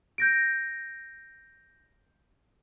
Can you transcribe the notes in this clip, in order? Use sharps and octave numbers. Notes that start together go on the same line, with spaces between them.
G6 A#6 D7